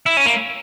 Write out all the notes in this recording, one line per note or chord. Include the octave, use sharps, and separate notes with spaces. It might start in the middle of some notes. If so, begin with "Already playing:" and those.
E4
C#4
A#3